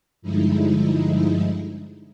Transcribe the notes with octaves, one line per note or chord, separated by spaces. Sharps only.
G2 D3 F3 G#3 D#4 E4